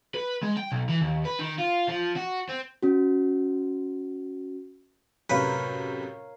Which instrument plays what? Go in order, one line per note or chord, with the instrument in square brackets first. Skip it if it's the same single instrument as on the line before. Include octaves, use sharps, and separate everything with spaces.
[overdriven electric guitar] B4
G#3
G5
B1
E3
D#2
B4
D#3
F4
F3
F#4
C4
[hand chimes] C#4 F#4
[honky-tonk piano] F#2 A2 C3 [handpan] A#4 C#5 F5 [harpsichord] B4